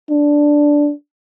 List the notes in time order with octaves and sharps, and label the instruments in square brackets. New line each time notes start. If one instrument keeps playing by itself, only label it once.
[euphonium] D4